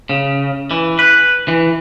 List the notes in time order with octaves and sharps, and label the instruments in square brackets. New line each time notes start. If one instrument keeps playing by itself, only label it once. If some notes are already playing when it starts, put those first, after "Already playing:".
[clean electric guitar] C#3
E3
B4
E3